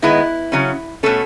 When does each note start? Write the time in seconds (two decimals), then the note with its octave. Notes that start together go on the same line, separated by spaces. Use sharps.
0.02 D#3 G#3 B3 E4
0.52 C#3 F#3 C#4
1.03 B2 A3 C#4 A4